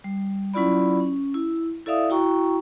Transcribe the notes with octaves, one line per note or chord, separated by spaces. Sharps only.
G3
F#3 C#4 E4 F4 D5 B5
C#4
E4
E4 A4 D5 E5 F5 D#6
E4 F#4 G5 A#5 C#6